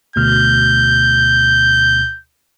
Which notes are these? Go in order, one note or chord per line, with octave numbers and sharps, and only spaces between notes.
D2 B2 F6 G6